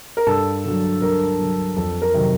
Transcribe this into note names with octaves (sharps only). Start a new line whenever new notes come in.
A#4
G2 A4
D3 F#3
G2 A#4
D3 F#3
F2 A4
A#4
C3 D#3 F#3